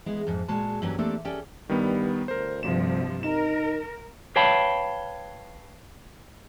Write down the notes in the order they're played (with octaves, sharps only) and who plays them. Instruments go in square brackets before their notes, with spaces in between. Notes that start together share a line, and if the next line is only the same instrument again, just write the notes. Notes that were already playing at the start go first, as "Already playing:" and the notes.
[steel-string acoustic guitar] G#3 B3 E4
F2 G#2
A#2 G#3 F#4 A5
G2 E3 F#3 A#3 C#4 G4
A3 A#3 C4 D4 G4 A4
C#4 G4 A4 D5 G5
[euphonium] G2 [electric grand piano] D#3 G3 B3
[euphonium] D2 [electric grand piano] A#4 C5
[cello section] G2 C3 F3 [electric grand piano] E7
[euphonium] D#4 [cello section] A#4 [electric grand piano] E7
[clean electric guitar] B4 C#5 F5 G5 A5 B5